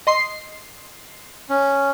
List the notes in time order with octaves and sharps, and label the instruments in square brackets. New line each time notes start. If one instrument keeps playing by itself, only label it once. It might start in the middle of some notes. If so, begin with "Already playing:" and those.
[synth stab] D#5 C6 C7
[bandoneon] C#4